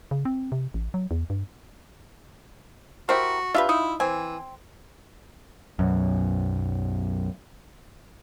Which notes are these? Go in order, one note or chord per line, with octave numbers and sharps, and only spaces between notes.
C#3
C4
C3
A1
F#3
E2
G2
E4 F#4 G4 A#4 C5
D4 F4 G4 B4 E5
D#4 E4
E3 C4 G#5
B1 F#2